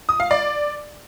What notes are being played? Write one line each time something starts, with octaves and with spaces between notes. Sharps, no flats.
D#6
F5
D5